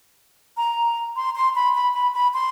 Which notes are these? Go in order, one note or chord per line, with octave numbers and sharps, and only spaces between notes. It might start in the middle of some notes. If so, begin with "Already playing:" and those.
A#5
C6
C6
B5
B5
B5
B5
C6